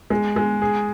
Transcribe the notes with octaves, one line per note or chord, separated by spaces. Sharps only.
G#3
G#3
G#4